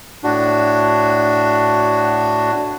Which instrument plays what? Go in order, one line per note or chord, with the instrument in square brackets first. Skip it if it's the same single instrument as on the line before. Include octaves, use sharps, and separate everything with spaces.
[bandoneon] A2 D4 F#4